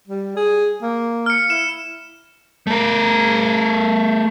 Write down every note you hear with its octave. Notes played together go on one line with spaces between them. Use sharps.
G3
G#4
A#3
F6 C#7
E4 E7
A3 A#4